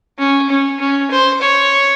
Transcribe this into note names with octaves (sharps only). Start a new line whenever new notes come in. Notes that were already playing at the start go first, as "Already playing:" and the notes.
C#4
C#4
C#4
C5
C#5